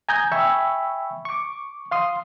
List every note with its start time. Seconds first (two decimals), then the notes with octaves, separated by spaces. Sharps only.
0.09 G#5 A#5 D#6 G6 G#6
0.32 E5 G5 G#5 B5 C#6 E6
1.25 C#6 D6
1.91 F5 C6 D#6